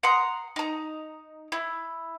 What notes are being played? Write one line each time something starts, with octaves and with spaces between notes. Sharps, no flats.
F#5 A#5 C6 D#6
D#4 A#5
E4